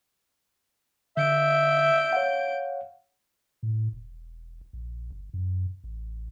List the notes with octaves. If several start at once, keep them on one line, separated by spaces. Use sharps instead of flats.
D3 E5 G6 D7
C#5 F5 F#5
A2
E1
A#1
G1
F#2
A1